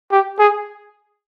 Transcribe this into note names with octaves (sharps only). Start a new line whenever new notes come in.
G4
G#4